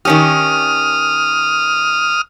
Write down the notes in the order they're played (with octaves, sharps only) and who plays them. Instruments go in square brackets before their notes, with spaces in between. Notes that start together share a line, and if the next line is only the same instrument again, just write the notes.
[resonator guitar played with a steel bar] D#3 C#4 G4 [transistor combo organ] D#6 F6